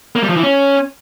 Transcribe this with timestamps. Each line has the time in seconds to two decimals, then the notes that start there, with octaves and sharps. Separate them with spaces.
0.16 A#3
0.22 G3
0.29 F3
0.36 E3
0.43 C#4